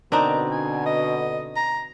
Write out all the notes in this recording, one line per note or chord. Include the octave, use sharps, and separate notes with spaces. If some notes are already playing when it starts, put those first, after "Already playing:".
B2 D3 C4 D4 D#4 A#4
G#5
D#5
A#5